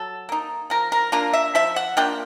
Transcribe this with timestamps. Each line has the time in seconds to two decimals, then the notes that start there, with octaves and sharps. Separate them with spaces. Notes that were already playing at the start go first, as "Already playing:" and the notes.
Already playing: F#3 A4
0.29 A#3 D#4
0.70 F3 A#4
0.92 A#4
1.12 A#3 D4 F4 A#4
1.33 E5
1.55 F3 E5
1.76 F#5
1.97 A#3 D4 F4 G5